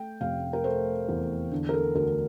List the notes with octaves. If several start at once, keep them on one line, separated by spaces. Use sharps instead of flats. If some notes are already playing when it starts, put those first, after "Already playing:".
Already playing: A3 G5
F1 F5
A#4
A3 C5
E2
D3
A#4
A4
D2 A#4